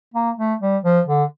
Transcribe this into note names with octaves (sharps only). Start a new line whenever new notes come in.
A#3
A3
G3
F3
D3